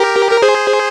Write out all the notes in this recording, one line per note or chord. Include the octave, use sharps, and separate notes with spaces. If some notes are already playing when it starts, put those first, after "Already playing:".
Already playing: G4 A#4
A#4
G#4 C5